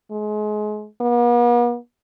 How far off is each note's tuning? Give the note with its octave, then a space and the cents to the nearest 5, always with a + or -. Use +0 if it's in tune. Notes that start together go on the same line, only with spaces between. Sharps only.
G#3 +30
B3 -45